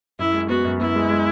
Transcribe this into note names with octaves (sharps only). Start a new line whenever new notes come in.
F#2 E4
G#3
B3 F#4
F#2
B3 E4
G#3
G#3